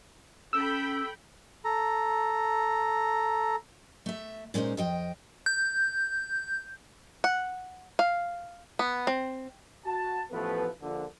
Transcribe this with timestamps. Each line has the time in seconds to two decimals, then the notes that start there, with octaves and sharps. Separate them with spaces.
0.53 C#4 A4 G5 B5 E6
1.65 A4 A#5
4.06 A3 E5
4.54 A#2 G#3 C#4 D#4 C5
4.77 F2 D#5 G5
5.46 G6
7.24 F#5
7.99 F5
8.79 B3
9.07 C4
9.85 F#4 A5
10.32 A1 F3 A3 B3 A4 B4
10.81 A#1 D3